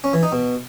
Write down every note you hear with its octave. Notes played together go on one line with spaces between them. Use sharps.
C#4
E3
D#4
B2